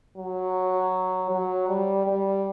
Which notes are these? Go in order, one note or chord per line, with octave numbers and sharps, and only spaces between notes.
F#3
F#3
G3
G3